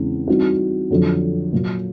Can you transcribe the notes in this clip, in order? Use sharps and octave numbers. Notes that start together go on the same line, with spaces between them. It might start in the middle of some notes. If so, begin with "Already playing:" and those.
Already playing: E2 C#3 E3 G#3 C4
E3 G3 C4 D#4 F#4
F2 D3 F#3
A#2 F#3 A#3